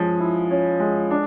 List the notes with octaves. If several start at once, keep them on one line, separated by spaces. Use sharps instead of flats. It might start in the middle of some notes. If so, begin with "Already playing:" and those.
Already playing: F3 G#3 C#4
E4
C#4
G#3
D4